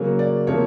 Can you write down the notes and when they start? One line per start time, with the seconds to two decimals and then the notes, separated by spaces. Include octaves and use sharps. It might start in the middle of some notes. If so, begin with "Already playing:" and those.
Already playing: C#3 F#3 A#3 C#5
0.19 D5
0.47 C3 F3 A#3 C#5